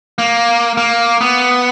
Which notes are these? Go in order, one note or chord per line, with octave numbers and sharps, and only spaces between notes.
A#3
A#3
B3